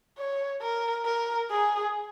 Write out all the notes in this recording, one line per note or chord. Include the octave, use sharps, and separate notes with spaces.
C#5
A#4
A#4
G#4